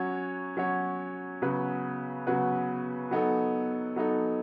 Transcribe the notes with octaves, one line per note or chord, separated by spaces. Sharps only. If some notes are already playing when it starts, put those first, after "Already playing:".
Already playing: F#3 C#4 F#4 C#5
F#3 C#4 F#4 C#5
C#3 F#3 B3 F#4 B4
C#3 F#3 B3 F#4 B4
F#3 B3 D#4 A4
F#3 B3 D#4 A4